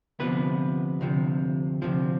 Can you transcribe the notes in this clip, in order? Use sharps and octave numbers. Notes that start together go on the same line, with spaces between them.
D2 C3 F3 B3 B4
D2 C3 F3
D2 C3 F3